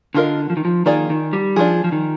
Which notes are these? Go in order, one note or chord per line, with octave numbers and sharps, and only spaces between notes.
D3 D4 F4 A#4 D#5
F3
D#3
F3
D#3 A#3 F4 G#4 D5
D#3
G3
F3 D4 F4 G#4
F3
D#3